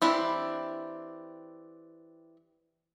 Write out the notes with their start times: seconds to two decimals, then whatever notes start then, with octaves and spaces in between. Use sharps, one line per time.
0.02 E3 C4 D4 E4 G4